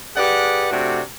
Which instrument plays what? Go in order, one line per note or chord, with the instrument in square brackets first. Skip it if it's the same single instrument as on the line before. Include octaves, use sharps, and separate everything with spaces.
[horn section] G4 G#4 B4 D5 F#5
C3 A3 D4 F#4